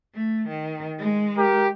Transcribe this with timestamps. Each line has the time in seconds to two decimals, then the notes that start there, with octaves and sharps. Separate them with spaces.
0.14 A3
0.49 D#3
0.99 G#3
1.37 G4 A#4